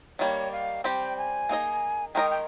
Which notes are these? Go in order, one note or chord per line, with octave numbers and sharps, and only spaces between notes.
D#3 G3 A#3 C#5
F5
G3 C4 G4 C5 G5
G#5
A#3 D#4 G#4 D#5
D#3 G#3 D#4 A#4 D#5 G5
G5